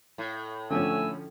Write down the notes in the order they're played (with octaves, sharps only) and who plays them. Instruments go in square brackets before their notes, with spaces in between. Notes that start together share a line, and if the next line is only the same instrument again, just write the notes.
[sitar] A2
[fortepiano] D3 F3 C#4 [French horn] A3 [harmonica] G#5 E6